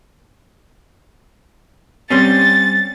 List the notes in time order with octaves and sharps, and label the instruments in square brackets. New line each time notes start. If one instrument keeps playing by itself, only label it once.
[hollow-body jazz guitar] G3 C4 C#4 [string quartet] A6